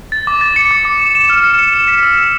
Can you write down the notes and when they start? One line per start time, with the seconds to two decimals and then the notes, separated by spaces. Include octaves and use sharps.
0.12 A6
0.27 D6
0.41 A6
0.56 C#7
0.71 D6
0.85 D6
1.00 E7
1.15 E7
1.30 F6
1.44 C#7
1.59 C#7
1.74 E7
1.88 B6
2.03 E6
2.18 E6